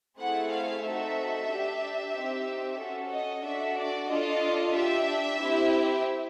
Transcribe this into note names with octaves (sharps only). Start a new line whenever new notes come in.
A3 C4 E4 G#4 F#5
F5
A3 C4 D#4 F#4 A4 E5
D4 G4
C4 D#4 G4
C#4 F#4 A4
D#5
D4 F#4 A4 E5
D5
D4 F4 A4 D#5
D4 G4 E5
C4 E4 G4